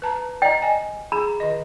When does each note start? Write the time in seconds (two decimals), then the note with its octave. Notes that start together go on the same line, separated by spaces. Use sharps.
0.02 B4 A5 A#5
0.42 D5 D#5 G5 A#5
0.62 D#5 G#5
1.12 G#4 A#5 B5
1.40 D#3 D#5